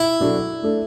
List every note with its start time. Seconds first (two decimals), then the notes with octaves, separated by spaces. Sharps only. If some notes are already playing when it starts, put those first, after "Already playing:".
Already playing: E4
0.20 B2 F#3 D4 F#4 A4
0.62 A3 D4 A4